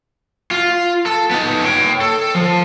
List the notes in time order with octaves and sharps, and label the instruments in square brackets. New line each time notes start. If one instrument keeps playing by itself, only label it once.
[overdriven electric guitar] F4
A4
B3 D#4
C#5 G5
A4
F3